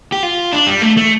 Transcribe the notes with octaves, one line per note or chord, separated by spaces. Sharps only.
G4
F4
D4
G3
A3
A3